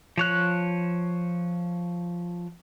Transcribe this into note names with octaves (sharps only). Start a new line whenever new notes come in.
F3 C#5 F#6